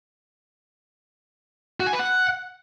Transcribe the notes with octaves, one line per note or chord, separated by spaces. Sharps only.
F#4
G#5
B4
F#5